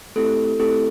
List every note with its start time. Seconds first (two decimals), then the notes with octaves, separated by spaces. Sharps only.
0.16 A3 C4 E4 G4 A4
0.60 A3 C4 E4 G4 A4